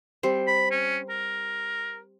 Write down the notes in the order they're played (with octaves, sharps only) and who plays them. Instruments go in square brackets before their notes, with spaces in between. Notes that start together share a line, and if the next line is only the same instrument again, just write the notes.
[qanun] G3 C4 C5
[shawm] B5
C#4
A#4